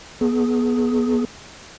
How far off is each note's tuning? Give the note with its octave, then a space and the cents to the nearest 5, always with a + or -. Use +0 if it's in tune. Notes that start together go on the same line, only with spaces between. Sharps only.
B3 -20 G#4 +20